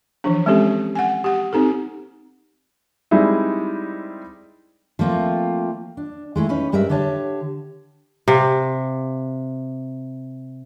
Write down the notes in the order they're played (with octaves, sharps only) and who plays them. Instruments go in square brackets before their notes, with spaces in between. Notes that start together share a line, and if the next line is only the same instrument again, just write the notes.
[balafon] E3 F3 D4
G#3 C4 C#4 G4 A4
F#5 G#5
G4 F#5
C4 D#4 G4 A4
[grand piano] G3 G#3 C4 D#4 E4
[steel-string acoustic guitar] F3 A3 A#3 C4 F4
D4
G#3 A3 E4 G#4
C#4 D#4 B4
G2 G3 G#3 A#4 B4 E5
D3 G4 C#5 A5
[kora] C3 F5